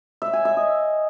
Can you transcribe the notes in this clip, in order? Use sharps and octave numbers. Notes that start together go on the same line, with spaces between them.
E5
G#5
E5
D#5